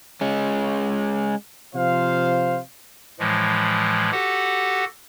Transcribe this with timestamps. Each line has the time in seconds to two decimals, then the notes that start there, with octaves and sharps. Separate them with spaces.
0.21 G#3 C#4
1.75 C3 F3 C5 F5
3.19 A2 E3 F3 G#3
4.12 F#4 G4 A4 F#5